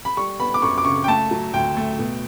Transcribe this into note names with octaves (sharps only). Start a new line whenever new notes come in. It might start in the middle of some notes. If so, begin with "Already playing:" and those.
B5
G3 C#6
B3 B5
D6
F#2 C#6
D6
C#3 C#6
G5
A3 A5
F#3
D2 G5
A3
B2